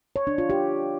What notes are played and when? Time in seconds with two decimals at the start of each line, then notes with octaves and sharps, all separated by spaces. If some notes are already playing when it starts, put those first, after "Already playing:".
0.16 C#5
0.27 D4
0.38 F4
0.50 G4